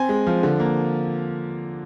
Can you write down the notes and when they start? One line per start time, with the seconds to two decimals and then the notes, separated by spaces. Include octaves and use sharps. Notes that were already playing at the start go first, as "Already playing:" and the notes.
Already playing: C4 G#5
0.09 G#3
0.27 F3
0.43 D3
0.60 A#3